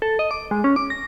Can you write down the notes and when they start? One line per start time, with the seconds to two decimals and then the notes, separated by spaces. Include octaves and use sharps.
0.02 A4
0.19 D#5
0.31 D6
0.51 G#3
0.64 C#4
0.76 D6
0.90 A#6